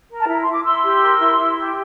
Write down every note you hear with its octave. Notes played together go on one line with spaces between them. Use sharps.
A#4
A5
E4 A#5
E4 C6
D6
E4 C6 E6
G4
A#4
E4
E4
G4